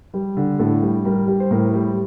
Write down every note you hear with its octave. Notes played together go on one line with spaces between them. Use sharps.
G3
D3
A2 A4
G3
G3 A#4
G3
C5
A2 A#4
G3